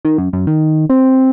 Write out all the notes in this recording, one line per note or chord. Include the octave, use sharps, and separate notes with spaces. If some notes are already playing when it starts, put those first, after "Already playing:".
D#3
F#2
F#2
D#3
C4